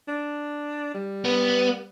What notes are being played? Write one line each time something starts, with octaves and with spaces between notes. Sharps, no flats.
D4
G3
B3